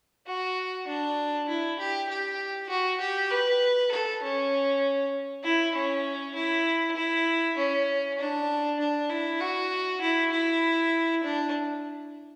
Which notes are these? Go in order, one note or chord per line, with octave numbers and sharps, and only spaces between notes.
F#4
D4
E4
G4
G4
F#4
G4
B4
A4
C#4
E4
C#4
E4
E4
C#4
D4
D4
E4
F#4
E4
E4
D4